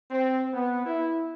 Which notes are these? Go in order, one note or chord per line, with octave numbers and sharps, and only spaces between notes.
C4
B3
E4